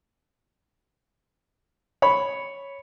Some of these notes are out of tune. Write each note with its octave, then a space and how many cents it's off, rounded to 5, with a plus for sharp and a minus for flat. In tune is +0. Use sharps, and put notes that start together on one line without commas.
C#5 +0 B5 +0